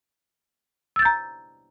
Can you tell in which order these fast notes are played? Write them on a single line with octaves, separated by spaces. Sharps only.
E6 A6 G6 A#5